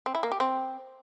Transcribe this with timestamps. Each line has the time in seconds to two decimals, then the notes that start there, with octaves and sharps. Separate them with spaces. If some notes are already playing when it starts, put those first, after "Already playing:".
0.06 C4
0.15 E4
0.23 A#3
0.32 G4
0.40 C4